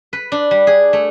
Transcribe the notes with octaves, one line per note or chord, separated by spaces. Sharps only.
B4
D4
G3
G#4
A3